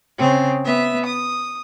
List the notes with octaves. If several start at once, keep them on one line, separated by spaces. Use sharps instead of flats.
C#3 C4
B3 E5
D#6